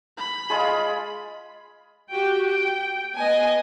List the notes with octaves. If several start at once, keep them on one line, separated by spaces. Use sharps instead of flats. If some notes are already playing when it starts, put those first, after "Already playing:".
B5
G#3 F4 G#4
F#4 G4 G5
G5
B3 D#5 G#5